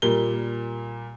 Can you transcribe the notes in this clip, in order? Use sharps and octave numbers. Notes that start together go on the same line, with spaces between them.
A#2 G3 A#4 G7